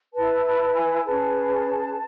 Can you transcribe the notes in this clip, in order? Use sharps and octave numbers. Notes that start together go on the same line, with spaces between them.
E4 B4 A5
A5
G#5
C#4 G#4 B4 A5